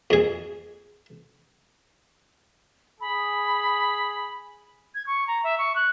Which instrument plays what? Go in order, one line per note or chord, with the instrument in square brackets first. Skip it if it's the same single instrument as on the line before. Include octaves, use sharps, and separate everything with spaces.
[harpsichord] F2 G#4
[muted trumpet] G#4 [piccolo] B5
[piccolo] G#6
C#6
A#5
E5
C#6
F#6